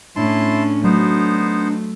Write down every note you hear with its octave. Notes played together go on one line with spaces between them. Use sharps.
A2 C#4 D4 E4 A5 C6
F#3 A3 B3 D#4 C5